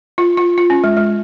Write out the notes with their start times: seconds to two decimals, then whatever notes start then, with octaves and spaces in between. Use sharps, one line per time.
0.18 F4
0.37 F4
0.58 F4
0.70 C#4
0.84 G#3
0.97 G#3